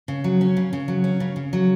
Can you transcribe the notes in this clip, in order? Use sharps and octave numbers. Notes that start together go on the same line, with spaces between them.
C#3
F#3
C#4
C#3
C#3
F#3
C#4
C#3
C#3
F#3